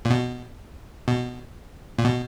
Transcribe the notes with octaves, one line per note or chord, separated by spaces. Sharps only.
A#2
B2
B2
A#2
B2